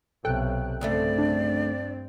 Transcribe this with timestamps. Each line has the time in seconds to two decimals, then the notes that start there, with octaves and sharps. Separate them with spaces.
0.25 B1 C3 A4 G5 F#6
0.81 D2 G2 C#3 A3 C4 D5
1.18 D4